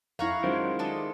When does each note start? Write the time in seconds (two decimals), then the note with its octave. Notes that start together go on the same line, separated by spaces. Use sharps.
0.19 F2 E4 C#5 F5 F#5 A#5
0.44 D#3 F#3 G#3 C#4 F4 C5
0.79 D4 A4 D#5